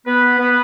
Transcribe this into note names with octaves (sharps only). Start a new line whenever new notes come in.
B3 B4
B3 B4